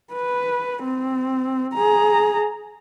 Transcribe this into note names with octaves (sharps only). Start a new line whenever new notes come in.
B4
C4
G#4 A#5